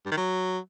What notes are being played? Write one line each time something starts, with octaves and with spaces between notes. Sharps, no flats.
G2
D#3
F#3